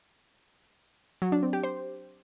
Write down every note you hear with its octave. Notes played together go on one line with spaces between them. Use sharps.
F#3
D4
C4
G4
C5